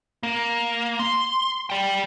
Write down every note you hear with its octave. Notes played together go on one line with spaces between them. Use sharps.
A#3
C6
D5 G5